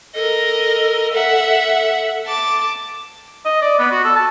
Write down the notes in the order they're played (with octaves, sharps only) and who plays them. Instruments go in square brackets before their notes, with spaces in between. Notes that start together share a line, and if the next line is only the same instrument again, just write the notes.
[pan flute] A4 [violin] A#4 D#5
[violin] E5 F#5
A5 D6
[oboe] D#5
D5
B3
F#4
A4
A5